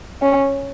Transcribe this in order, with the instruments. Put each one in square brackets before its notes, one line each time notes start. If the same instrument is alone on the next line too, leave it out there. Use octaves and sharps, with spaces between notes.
[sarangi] C#4